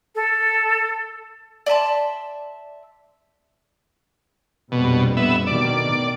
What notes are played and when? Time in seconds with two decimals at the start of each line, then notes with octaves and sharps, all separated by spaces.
0.15 A4
1.66 D5 E5 A5 C6
4.72 A#1 F2 B2 G3
5.17 B3 E5
5.47 D2 B2 D#3 D5